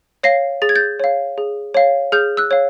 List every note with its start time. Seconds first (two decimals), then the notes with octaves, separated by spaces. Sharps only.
0.23 C#5 F5 A#6 C7
0.62 G#4 A6
0.69 G#6
0.76 G6 A6
1.00 C#5 F5
1.38 G#4
1.74 C#5 F5
2.12 G#4 F6 G6
2.37 E6 F#6
2.51 C#5 F5